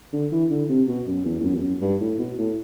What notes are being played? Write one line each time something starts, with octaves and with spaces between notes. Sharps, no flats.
D3
E3
D3
C3
B2
F#2
E2
E2
F#2
E2
F#2
G2
A2
B2
A2